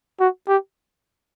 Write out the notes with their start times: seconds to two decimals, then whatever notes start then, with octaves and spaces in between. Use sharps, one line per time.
0.20 F#4
0.48 G4